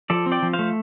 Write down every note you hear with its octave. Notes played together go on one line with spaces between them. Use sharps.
F3 A4 D5
C4
D5 G5
F3
C5 F5
A3